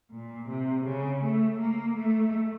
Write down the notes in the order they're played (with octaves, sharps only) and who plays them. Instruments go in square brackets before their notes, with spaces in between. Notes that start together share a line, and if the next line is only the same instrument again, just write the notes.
[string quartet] A#2
C3
C#3
A3
A#3
A3